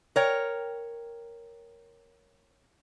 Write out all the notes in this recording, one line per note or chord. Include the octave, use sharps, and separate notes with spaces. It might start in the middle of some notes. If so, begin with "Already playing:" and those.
A#4 C#5 G5